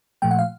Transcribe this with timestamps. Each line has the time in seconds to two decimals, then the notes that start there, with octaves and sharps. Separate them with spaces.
0.22 A#2 F3 A3 G5
0.31 F#5
0.39 F5